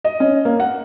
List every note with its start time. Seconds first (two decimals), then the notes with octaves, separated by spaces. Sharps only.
0.04 D#5
0.20 C#4
0.45 A#3
0.60 F#5